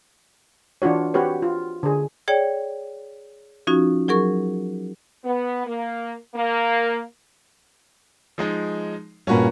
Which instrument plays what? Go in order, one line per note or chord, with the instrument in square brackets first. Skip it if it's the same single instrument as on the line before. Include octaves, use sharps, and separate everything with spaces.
[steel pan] E3 D4 F4 F#4 C#5
C4 F#4 G4 B4 C#5
F4
D3 G#4
[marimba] G#4 C#5 D5 G5
F3 C#4 D#4 F4 F#4
F#3 G#4 A#4 C#6
[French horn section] B3
A#3
A#3
[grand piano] F3 G#3 D#4
[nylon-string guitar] G2 A#2 [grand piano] C#4 F#4 B4